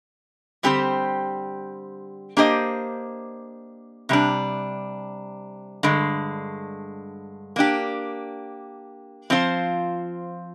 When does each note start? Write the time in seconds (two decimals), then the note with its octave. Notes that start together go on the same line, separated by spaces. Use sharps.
0.63 D3 G3 C4 G4 C5
2.37 A#3 D4 G4 C5 D#5
4.09 C3 G3 D4
5.83 G2 D3 G#3
7.56 A#3 D4 G4
9.30 F3 C4 F4 C5